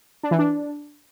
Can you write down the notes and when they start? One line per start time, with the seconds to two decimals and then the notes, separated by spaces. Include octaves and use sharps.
0.23 D4
0.31 E3
0.39 D4